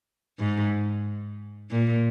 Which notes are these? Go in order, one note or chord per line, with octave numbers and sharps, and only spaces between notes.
G#2
A#2